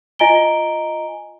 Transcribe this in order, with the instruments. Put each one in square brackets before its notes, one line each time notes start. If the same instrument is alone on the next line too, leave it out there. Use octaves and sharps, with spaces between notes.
[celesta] F4 D#5 G#5 A#5 D7 G7